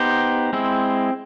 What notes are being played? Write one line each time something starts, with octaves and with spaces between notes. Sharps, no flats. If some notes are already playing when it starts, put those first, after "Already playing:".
Already playing: B3 D#4 G4 C5
G#3 C4 E4